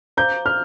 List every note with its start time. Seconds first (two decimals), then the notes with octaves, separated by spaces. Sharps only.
0.17 C5 F5 A#5 D6 G6
0.46 F6